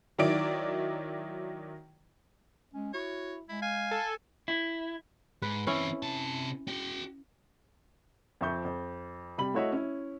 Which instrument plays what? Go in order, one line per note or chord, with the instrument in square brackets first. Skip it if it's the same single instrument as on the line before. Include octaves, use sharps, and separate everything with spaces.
[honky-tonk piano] D#3 F#3 D#4 E4 D5 D7
[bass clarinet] G#3 [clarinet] C#4
[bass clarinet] E4 [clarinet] F#4 [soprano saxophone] C#5
[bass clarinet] G#3 [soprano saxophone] E4
[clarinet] F5 [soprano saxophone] G#5
[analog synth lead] A4
[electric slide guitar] E4
[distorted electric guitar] G#2 [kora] B4
[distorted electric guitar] E3 C4 [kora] C#4 E4
[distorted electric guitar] C3 A5
F#4 G5
[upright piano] F2 F3 E5 C#6 G6
F2
C3 G3 B5 F#7
A3 E4 F#4 C#5 D#5 E5
C#4 E4